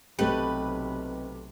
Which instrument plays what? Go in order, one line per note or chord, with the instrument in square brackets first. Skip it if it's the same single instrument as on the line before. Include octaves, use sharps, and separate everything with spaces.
[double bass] B1 C3 [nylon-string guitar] A3 G4 [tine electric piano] C4 D#5 [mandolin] B4